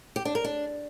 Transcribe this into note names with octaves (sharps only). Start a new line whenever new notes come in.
G4
D4
A#4
D4